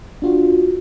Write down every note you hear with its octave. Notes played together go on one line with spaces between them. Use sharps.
D4 F4 F#4